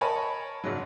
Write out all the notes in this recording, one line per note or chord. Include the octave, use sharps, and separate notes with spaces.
A#4 C#5 D#5 G#5 A5 B5
F#1 G#2 F#3